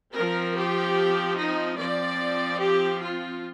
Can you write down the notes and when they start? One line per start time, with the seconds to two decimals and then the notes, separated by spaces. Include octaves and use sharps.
0.14 F3 C4 A#4
0.56 G4
1.37 D#4
1.77 F3 C4 D5
2.59 G4
3.01 F4